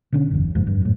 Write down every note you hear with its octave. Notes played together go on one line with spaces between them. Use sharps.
B2 D3 C#4
F#1 E2
F#1 F2 G#2
G2
F#2 A2